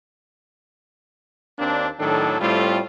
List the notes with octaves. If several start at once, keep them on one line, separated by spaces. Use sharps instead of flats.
D#2 A#3 C4 D4
A2 D#3 F#3 D4 A4
A2 G3 A3 C4 F4